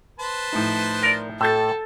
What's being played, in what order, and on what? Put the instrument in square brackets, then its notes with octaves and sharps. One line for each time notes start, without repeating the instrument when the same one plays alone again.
[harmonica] B4 C5 A5
[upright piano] A2 F3 D#4
[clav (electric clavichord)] A#4 D5
[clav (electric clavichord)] A2 [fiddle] A4 [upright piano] E6 G6 A6